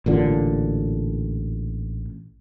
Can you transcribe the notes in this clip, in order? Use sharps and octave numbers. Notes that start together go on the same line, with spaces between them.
A1 A#2 D3